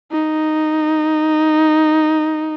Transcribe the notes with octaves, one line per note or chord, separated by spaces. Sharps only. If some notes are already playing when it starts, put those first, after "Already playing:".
D#4